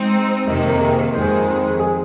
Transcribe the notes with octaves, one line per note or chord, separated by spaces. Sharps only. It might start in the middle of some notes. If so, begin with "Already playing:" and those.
Already playing: G#3 C4 D#4
F2 C3 D#3 A#3 D#5
C5
A#4
G#4
C5
F2 D#3 G#3 C5
G#4